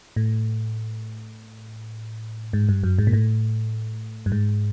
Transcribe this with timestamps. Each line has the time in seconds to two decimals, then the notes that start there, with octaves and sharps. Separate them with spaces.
0.16 A2
2.53 G#2
2.69 G2
2.83 F#2
2.99 G#2
3.07 A#2
3.13 A2
4.26 G2
4.32 G#2